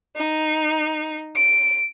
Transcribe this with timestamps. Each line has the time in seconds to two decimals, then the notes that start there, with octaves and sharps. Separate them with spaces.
0.17 D#4
1.36 D7